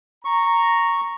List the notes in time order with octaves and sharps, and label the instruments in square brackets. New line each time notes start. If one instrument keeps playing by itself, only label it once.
[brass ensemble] A#5 [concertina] C#6